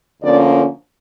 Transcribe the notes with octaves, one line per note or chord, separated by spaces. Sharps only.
D2 D3 F3 A#3 C#4 D5